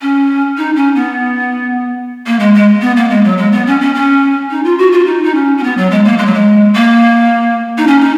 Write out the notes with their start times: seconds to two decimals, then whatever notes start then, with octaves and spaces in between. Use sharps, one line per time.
0.02 C#4
0.58 D#4
0.76 C#4
0.96 B3
2.27 A#3
2.40 G#3
2.54 G#3
2.82 B3
2.96 A#3
3.10 G#3
3.24 F#3
3.38 G#3
3.52 B3
3.67 C#4
3.81 C#4
3.95 C#4
4.51 D#4
4.65 F4
4.78 F#4
4.92 F4
5.07 D#4
5.24 D#4
5.35 C#4
5.58 C#4
5.63 B3
5.77 F#3
5.91 G#3
6.05 A#3
6.19 G#3
6.26 F#3
6.34 G#3
6.75 A#3
7.78 D#4
7.87 C#4
8.01 D#4